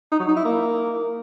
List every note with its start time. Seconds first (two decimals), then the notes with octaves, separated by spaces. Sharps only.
0.12 D#4
0.20 F#3
0.28 D#4
0.37 E4
0.45 A#3